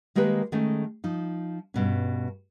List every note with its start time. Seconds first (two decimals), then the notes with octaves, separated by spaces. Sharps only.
0.15 D#3 G#3 A#3 G4 B4
0.52 D#3 G#3 A3 C#4 D#4
1.04 F3 D#4
1.74 G2 B2 C#4